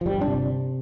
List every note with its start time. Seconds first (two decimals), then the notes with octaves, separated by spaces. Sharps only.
0.01 F3
0.06 G1 G3
0.21 C3 D4